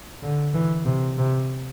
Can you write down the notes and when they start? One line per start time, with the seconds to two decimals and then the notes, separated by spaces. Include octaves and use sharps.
0.23 D3
0.54 E3
0.85 C3
1.18 C3